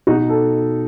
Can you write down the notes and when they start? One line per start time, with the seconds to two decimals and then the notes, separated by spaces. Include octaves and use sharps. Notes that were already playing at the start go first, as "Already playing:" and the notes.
0.07 B2 D#4 F#4
0.29 A4